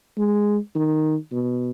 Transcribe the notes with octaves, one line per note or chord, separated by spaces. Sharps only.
G#3
D#3
B2